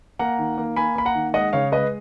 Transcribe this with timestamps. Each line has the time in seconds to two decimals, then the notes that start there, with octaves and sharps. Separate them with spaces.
0.19 A#3 F#5 A#5
0.39 D#3
0.58 A#3
0.76 A#3 G#5 B5
0.96 A#3 B5
1.05 F#5 A#5
1.15 D#3
1.34 G#3 D#5 F#5
1.53 C#3 C#5 F5
1.72 G#3 B4 D#5